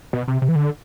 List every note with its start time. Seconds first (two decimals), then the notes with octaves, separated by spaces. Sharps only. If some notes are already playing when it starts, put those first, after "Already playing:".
0.13 B2
0.28 C3
0.42 C3
0.48 E3
0.55 D3